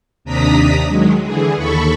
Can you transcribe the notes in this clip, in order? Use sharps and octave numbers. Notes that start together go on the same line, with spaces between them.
D#2 C3 D4 A#5 D#6 B6
D#3 F#3 G#3
D3 E3 G#4
D#2 A4 B5 C#6